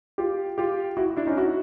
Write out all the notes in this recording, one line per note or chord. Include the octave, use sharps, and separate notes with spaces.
F4 G4
F4 G4
E4 F#4
D4 E4
C#4 D#4
E4 F#4